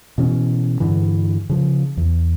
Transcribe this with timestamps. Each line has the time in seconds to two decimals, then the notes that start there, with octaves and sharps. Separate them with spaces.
0.18 B2 E3 C#4
0.80 G2 D3 E3
1.49 C#3 F3
1.97 E2